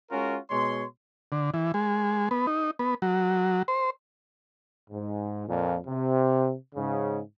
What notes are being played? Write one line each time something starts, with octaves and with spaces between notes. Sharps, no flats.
G#3 C#4 F4 F#4 A#4
B2 G#3 C#5 C6
D3
E3
G#3
B3
D#4
B3
F#3
C5
G#2
F2 A#2
C3
G#2 C#3